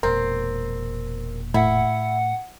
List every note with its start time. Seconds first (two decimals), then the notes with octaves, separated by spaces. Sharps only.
0.03 E1 A#2 C4 A#4
1.54 A2 E4 F#5